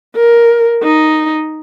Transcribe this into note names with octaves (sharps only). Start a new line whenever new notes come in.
A#4
D#4